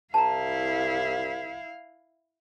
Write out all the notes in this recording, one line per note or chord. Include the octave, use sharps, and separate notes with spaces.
C2 E4 F5 A5 A#5